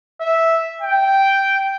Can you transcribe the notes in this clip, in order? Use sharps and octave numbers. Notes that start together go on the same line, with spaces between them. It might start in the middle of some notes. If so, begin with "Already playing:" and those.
E5
G5